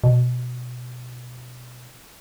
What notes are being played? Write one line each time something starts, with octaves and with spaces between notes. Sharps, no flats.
B2